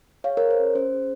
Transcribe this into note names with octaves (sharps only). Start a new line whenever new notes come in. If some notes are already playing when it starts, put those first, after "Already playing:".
G#4 C#5 F5
G#4 A#4 C#5
C5
C#4
C#4 C5
G#4